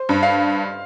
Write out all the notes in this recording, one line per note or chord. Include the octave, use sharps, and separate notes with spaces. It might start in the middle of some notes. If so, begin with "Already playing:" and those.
Already playing: C5
G2
F5